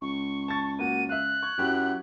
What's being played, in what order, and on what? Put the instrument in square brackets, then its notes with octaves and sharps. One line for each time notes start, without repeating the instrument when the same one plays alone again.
[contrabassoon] C#2 [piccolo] C#6
[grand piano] A5 A6
[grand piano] A#3 F#4 [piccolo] D#7
[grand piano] E5 F5 [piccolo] F#6
[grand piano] C#6 G#6
[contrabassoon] F#2 [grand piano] E4 F#4 G4